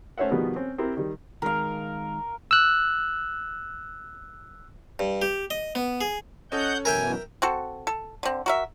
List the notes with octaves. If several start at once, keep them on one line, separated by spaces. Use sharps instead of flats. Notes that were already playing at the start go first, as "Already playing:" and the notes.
A3 C#4 C5 C#5 E5 F#5
B2 D#3 F3 G3 B3 G#4
C4 C#4
C4 E4 G4 A#4 C5
D#3 G3
D#3 G#3 A#4 F5
E6 F#6
G2
G4
D#5
B3
G#4
C#4 A4 D#5 F#5 G6
F#2 B2 E3 A#4 E5 G5 G#5
C4 F#4 A4
A4
D3 C4
F#4 A#4 E5